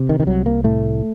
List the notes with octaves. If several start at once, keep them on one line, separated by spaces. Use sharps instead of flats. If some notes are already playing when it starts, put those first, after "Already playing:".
Already playing: C3
D#3
D#3
C2 F#3
A#3
A2 A3